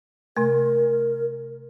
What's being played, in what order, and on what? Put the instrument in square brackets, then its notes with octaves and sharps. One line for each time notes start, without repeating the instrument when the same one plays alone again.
[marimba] C3 A3 [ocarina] A#4